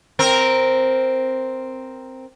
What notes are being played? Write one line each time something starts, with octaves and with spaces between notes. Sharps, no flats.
C4 A#4